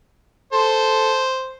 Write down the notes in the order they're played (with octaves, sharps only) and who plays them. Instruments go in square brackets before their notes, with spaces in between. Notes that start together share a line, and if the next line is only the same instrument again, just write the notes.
[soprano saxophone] A4 [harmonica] C5